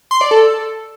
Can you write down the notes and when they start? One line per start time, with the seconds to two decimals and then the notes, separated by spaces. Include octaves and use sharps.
0.11 C6
0.21 D5
0.31 A4